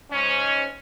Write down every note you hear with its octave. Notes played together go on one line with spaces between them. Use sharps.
G#2 C#4